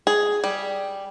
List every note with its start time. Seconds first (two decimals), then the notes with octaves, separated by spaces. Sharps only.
0.07 G#4
0.44 G3